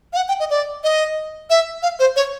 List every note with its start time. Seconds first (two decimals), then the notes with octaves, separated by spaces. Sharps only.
0.13 F5
0.17 F#5
0.28 G5
0.40 D#5
0.50 D5
0.84 D#5
1.50 E5
1.83 F5
1.99 C5
2.16 C#5